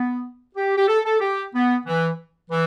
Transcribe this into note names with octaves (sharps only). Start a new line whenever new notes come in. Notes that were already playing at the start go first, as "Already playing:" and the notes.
Already playing: B3
G4
G4
A4
A4
G4
B3
E3
E3